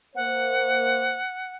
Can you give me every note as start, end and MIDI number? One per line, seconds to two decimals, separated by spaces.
0.15 1.20 58
0.15 1.20 72
0.15 1.56 78